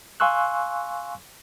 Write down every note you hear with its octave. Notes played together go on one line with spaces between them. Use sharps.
F5 G#5 C6 C#6 E6 F#6